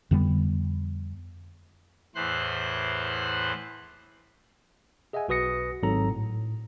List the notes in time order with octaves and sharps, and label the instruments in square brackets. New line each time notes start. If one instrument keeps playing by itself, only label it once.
[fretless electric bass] F2 D3 G3 B3
[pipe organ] E2 A2 E3 C5 C6 F#6
[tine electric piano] G#4 D#5 E5 F#5 G#5
B1 F#4 B4 D#6 A#6 C#7
G#1 G#2 F#3 C4 A4 A#5
A2